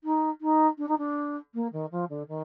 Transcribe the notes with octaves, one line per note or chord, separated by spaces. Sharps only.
D#4
D#4
D4
D#4
D4
A#3
D#3
F3
D3
D#3